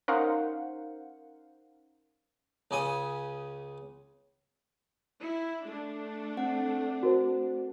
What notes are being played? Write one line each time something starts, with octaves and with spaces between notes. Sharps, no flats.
C#4 D#4 A#4 C5 F5 F#5
C#2 C#3 G#5 D#6
E4
A3 D4
C4 F#5
F#4 A#4 C5